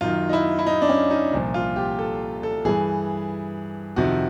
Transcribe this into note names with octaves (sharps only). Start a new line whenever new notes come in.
F#2 D#3 F4
D#4
E4
E4
D#4
D4
C#4
D#4
C2 A#2 F3
F4
G4
A4
A4
G2 E3 G#4
F2 C3 D#3 F#4